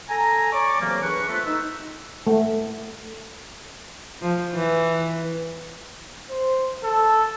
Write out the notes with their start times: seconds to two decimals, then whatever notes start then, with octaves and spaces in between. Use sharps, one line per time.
0.10 A4 G#5 A#5
0.53 C#5 D5 C#6 D6
0.80 D2 C3 E3 F#3 A#3
1.02 E2 D4 B4 C#6
1.28 A3 C4 F4 A4 B4
1.46 D#4 E6
2.27 A3
4.21 F3
4.54 E3
6.30 C5
6.83 A4